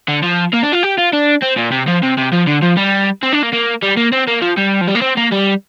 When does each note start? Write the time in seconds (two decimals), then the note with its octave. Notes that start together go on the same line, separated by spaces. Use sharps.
0.08 D3
0.23 F3
0.53 A#3
0.63 D4
0.72 F4
0.83 G4
0.98 F4
1.13 D4
1.43 C4
1.58 A#2
1.72 C3
1.88 F3
2.03 C3
2.18 C3
2.33 F3
2.48 D3
2.63 F3
2.77 G3
3.23 C4
3.32 D4
3.42 A#3
3.52 A#3
3.82 G3
3.97 A#3
4.12 C4
4.28 A#3
4.42 F3
4.57 G3
4.81 F3
4.88 G3
4.95 A#3
5.02 C4
5.18 A#3
5.32 G3